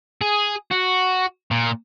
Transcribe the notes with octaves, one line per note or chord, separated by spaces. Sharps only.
G#4
F#4
A#2